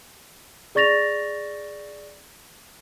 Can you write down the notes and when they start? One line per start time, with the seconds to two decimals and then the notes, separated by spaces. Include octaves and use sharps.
0.75 G#4 D5 C#6 A6 A#6 F7